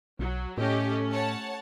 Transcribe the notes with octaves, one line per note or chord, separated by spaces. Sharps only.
B1 F#3
A2 A3 C#4 G4 A4 D#5
C#5 F#5 A5